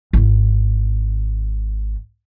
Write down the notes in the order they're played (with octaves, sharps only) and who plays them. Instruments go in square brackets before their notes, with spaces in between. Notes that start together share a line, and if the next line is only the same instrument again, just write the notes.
[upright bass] G#1 E4